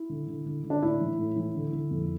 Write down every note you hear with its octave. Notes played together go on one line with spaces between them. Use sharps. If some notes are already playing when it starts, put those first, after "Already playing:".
Already playing: E4
D3
D3
D3
D3
D4
A2 E4
E3
A2
E3
D3
D3
F2